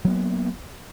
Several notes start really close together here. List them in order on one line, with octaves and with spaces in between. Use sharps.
F#3 B3 A#3